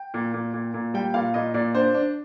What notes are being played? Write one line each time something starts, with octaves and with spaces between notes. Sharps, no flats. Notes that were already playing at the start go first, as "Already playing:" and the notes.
Already playing: G5
A#2
A#2
A#2
A#2
G3 G5
A#2 F5
A#2 D#5
A#2 D5
D4 C5
D4